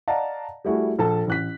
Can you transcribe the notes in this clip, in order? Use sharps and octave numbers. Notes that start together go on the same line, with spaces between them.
D5 D#5 F5 F#5 A5 A#5
G3 A3 E4 F#4 G#4
A#1 A4 A5
A1 F#6 B6